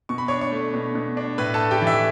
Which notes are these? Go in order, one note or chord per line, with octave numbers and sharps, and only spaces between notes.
B2 C#6
B5
D4 C#5 C#6
C#5 C#6
A3
B2
B2
D4
A2 B4 B5
A4 A5
A3
G4 G5
E3
E5